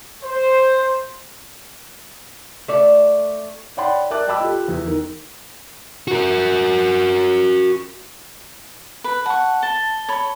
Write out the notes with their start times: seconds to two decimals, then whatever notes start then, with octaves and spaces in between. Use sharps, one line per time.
0.24 C5
2.68 A3 D5
3.77 C#5 D5 F#5 G5 B5 C6
4.11 A#4 D5 E5 A5 D6 F#6
4.27 D#5 G5 A5 B5 D6 E6
4.40 F4 G4 A4
4.68 E2
4.86 D#3 A#4
6.08 F#4 A#4
9.04 B4
9.26 F#5 A5 C#6
9.63 A5 G7
10.08 C#5 B5